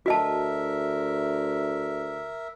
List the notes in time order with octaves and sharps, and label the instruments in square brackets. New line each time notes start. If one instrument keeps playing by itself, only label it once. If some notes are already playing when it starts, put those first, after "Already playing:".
[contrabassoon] D2 [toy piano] F#4 D#5 A5 [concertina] A#4 E5